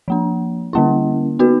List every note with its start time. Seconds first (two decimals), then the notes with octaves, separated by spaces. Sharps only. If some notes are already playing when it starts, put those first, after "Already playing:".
0.08 F3 A#3 D4
0.73 D3 G3 A#3 C#4 E4
1.39 B3 D#4 F#4 B4